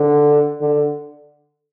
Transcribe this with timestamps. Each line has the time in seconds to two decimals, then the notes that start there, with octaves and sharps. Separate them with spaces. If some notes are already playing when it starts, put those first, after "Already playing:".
Already playing: D3
0.61 D3